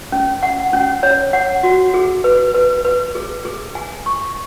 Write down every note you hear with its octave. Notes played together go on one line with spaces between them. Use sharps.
C#4
F#5
C#4
C#5
F#5
F#4
G#4
B4
B4
B4
G#4
G#4
G#5
C#6